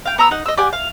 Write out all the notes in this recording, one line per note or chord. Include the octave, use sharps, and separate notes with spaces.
F5 G5
B3 A#5 E6
D#4 F#5
D#5 E6
G4 D5 F#5 G#5
F5